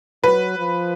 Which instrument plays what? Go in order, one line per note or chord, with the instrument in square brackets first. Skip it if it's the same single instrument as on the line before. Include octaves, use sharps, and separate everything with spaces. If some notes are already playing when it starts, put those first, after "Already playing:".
[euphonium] F#3 [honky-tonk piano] B4
[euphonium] F3